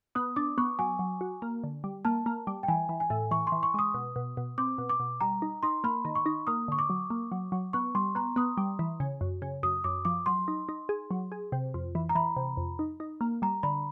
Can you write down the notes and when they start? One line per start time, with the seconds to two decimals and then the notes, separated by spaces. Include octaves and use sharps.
0.15 B3 D#6
0.36 D4 D6
0.58 B3 C#6
0.79 F#3 G#5
0.99 F#3
1.21 F#4
1.42 A#3
1.64 D3
1.84 G3
2.05 A#3 A5
2.26 A#3
2.47 G3
2.63 G5
2.68 E3 G#5
2.89 E3
3.00 G#5
3.10 A2
3.31 E3 C#6
3.47 C6
3.52 E3
3.63 C#6
3.74 G#3 D#6
3.94 B2
4.16 B2
4.37 B2
4.58 C4 D6
4.78 B2
4.89 D6
5.00 B2
5.21 G3 A#5
5.42 D#4
5.63 D#4 C6
5.84 A#3 B5
6.05 D#3
6.15 C#6
6.26 D#4
6.47 A#3 D#6
6.68 D3 C#6
6.79 D6
6.90 F#3
7.10 A#3
7.32 F#3
7.52 F#3
7.73 B3 C#6
7.95 G3 C6
8.15 B3 A#5
8.36 B3 D#6
8.58 G3
8.79 E3
9.00 C#3
9.21 F#2
9.42 C#3
9.63 F#2 D#6
9.84 F#2 D6
10.05 F3 D6
10.26 F#3 C6
10.48 D#4
10.69 D#4
10.89 G#4
11.11 F#3
11.32 G#4
11.52 C3
11.74 F2
11.95 E3
12.09 A#5
12.15 E3 B5
12.37 C3
12.57 F2
12.79 D#4
13.00 D#4
13.21 A#3
13.42 G3 A#5
13.63 D3 B5